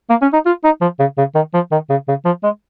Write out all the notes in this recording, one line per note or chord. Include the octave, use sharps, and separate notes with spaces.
A#3
C#4
D#4
F4
D#4
F3
C#3
C#3
D#3
F3
D#3
C#3
C#3
F3
G#3